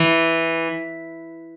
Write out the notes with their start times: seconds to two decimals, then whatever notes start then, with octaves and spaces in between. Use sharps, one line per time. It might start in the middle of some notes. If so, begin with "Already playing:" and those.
Already playing: E3